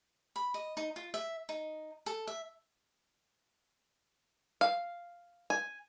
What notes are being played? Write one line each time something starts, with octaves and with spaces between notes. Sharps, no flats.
B5
D#5
D#4
F4
E5
D#4
A4
E5
F5
G#5